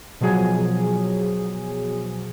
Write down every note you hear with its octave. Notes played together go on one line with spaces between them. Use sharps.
B2 F3 F#3 G#4 G#5